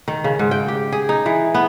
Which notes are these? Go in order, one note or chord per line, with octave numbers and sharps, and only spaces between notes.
D#3
C#3
G#2
G5
G4
G#4
D#4
E3
B3